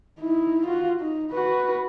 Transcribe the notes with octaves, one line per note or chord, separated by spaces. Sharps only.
D#4 E4
F4 F#4
D#4
F#4 B4